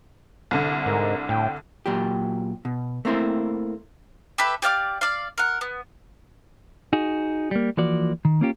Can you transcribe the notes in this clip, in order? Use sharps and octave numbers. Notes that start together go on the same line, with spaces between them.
C2 D3
G#2 A#4
A2 G5
A#2 F#3 G4
B2
A3 A#3 C4 E4 C5
G4 A4 B4 E5
G4 D5 F5 D6
D5 F5
A#4 F#5
B3
D#4 F#4 G#4
G3 A#3
E3 F3 A#3 F#4 D5
D#3
A#3 C#4 F4 G4